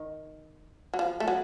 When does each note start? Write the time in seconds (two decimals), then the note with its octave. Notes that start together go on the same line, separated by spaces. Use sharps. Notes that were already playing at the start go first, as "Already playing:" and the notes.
Already playing: D#3
0.93 F#3
0.99 F3
1.20 A3
1.28 F#3